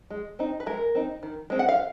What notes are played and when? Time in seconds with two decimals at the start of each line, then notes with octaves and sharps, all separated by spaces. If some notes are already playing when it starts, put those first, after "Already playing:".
0.10 G#3
0.39 C4 D#4
0.60 B4
0.66 G#3 A#4
0.95 C4 D#4
1.23 D#3
1.50 G#3 C4
1.59 F#5
1.69 F5